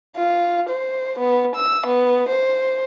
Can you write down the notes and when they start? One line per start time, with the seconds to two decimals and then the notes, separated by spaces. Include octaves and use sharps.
0.16 F4
0.69 C5
1.19 B3
1.56 E6
1.87 B3
2.29 C5